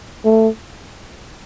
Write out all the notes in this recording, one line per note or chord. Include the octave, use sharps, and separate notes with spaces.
A3